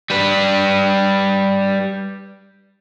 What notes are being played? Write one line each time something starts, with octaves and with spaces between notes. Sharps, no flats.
G3 B4